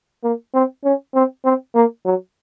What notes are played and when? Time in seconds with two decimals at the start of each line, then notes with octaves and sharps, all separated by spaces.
0.24 A#3
0.54 C4
0.85 C#4
1.15 C4
1.45 C4
1.75 A#3
2.05 F#3